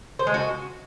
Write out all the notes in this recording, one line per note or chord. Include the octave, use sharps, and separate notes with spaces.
C5
G#3
F#4